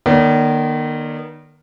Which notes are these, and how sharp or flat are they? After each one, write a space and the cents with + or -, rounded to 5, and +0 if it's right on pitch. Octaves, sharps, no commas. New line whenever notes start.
D#3 -30 A#3 +45 D5 -40